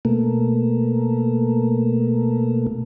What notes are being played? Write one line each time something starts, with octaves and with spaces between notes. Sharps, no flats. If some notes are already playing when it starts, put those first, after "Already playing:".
B2 A3 A#3